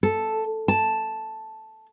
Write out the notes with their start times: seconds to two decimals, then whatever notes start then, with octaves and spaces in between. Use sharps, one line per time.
0.03 A4
0.68 A5